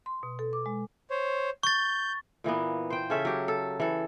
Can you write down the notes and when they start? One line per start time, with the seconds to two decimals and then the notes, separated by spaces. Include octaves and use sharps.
0.06 C6
0.23 B2
0.39 A4
0.53 D6
0.66 G#3
1.10 C5 C#5
1.63 C#6 G6 A6
2.44 A#2 E3 A#3 B3
2.90 C5 G5
3.10 C#3 C#4 A4 E5
3.25 F#3 G4
3.48 A4
3.80 E3 A4